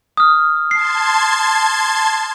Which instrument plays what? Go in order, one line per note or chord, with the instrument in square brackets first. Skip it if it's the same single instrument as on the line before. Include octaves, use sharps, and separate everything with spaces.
[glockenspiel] D#6 F6
[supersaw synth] A5 C6 G#6 [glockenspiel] C7